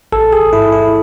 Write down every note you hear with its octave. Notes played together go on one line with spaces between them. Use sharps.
A1 A4
A1 G#4
G#2 E4
A1 E4